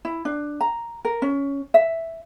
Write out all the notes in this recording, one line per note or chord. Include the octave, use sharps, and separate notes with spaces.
E4
D4
A#5
A#4
C#4
E5